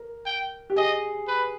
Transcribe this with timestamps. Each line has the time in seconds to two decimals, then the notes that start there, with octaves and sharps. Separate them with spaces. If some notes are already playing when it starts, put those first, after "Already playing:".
Already playing: A#4
0.26 G5
0.70 G4
0.76 G#4 D#5
1.28 B4